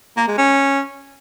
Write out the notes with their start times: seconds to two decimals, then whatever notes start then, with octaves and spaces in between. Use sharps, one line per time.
0.17 A#3
0.27 G#3
0.38 C#4